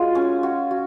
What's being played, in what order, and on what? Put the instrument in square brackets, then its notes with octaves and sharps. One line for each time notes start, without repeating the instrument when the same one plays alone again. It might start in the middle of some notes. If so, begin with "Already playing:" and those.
Already playing: [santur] G#3 F#4 [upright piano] F4
[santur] C#4
F#4
F#4